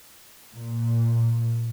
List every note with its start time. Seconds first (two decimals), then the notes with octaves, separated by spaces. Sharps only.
0.54 A#2